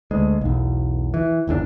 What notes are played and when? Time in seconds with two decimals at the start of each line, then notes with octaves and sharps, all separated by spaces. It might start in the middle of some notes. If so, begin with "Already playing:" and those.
0.11 D2 G#3
0.41 B1 E2
1.14 E3
1.47 G1 E2 C3 D4